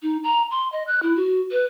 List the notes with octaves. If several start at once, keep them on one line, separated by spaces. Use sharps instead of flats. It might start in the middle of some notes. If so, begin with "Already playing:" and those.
D#4
A#5
C6
D#5
F#6
E4
F#4
B4